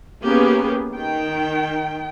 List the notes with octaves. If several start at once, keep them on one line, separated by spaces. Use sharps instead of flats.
A#3 B3 C#4 G4 G#4
D#3 G5